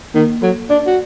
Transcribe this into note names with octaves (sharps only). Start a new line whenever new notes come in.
D#3 A#3
F#3 A4
D4 D5
F#4